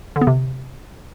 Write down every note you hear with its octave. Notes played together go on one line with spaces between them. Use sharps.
D3
B3
C3